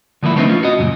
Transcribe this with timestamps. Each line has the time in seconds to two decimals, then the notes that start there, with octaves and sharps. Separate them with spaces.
0.23 D3 F3 A#3 E4
0.36 A3 B3 C4 D4 D#4 B4
0.49 C#4 F4
0.63 F#4 D#5
0.78 C#2 F#2 A#2